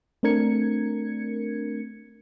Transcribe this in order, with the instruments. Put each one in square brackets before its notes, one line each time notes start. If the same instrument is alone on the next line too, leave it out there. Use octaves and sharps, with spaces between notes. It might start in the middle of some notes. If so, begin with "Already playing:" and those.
[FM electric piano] A3 C4 D4 A#4 G#6 C#7